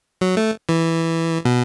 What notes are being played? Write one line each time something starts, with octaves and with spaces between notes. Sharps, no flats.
F#3
A3
E3
B2